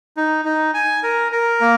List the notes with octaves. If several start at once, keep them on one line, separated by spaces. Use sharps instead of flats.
D#4
D#4
G#5
A#4
A#4
A#3